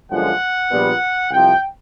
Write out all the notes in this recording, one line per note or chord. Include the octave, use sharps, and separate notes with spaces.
G1 F#2 D3 F3 G#3 F#5
A#1 A#2 G3 B3
C2 C3 F3 G5